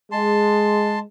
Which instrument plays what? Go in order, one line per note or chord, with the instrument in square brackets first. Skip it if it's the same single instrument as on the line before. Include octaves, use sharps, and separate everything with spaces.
[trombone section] G#3 [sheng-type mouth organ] A5 C6